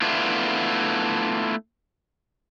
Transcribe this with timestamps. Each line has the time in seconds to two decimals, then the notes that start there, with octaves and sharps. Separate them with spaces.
0.02 A3 B3 D4 E4 F4